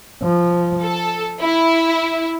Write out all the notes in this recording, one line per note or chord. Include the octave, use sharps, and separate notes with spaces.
F3
A4
E4